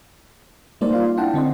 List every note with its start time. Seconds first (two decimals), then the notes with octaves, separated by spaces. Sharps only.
0.81 G3 G#3 A#3 D#4 C5 D5
0.93 F4 F5 C6
1.17 D4 E4 F#5 G5 A5
1.34 D3 C4 D#5 C6